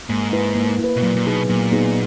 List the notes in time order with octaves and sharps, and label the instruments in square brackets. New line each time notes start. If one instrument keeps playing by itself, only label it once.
[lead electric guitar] G#2 [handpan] A#3
[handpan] E4 B4
A#3
E4
B4
[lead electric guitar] B2
[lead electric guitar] A#2 [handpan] F#3
[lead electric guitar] A#2
[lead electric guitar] B2 [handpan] B3 D#4 G#4
[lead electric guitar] A#2 [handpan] F#3
[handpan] B3 D#4 G#4